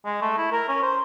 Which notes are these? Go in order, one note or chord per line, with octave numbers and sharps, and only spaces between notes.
G#3
A3
E4
A#4
C#4
C5